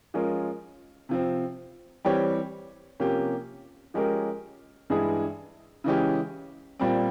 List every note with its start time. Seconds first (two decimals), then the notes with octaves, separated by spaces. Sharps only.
0.14 F3 G#3 C#4 F4 A#4
1.09 C3 F3 C4
2.05 E3 G3 C4 G4 C#5
3.00 C3 F3 A#3 C#4 G4
3.94 F3 G#3 C#4 G4 A#4
4.90 G2 E3 G#3 E4 G#4
5.84 C#3 E3 G#3 C#4 G4
6.80 A#2 G3 C4